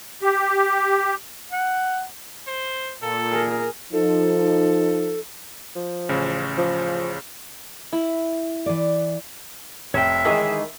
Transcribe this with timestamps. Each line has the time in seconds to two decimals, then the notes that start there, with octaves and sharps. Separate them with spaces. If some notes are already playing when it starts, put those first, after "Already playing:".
0.22 G4
1.51 F#5
2.48 C5
3.02 A#2 A4
3.31 G#4 A#4
3.93 F3 D#4 A4
5.76 F3
6.09 A1 C#3
6.58 F3
7.93 E4
8.66 E3 D5
9.94 F1 C#5 E5 G5
10.25 D#3 E3 G#3 G#4